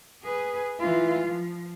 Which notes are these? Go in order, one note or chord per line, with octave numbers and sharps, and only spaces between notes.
G#4 B4
E3 F4
F3